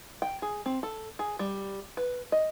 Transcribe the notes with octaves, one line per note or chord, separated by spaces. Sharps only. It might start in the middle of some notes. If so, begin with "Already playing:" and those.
G5
G#4
C4
A4
G#4
G3
B4
D#5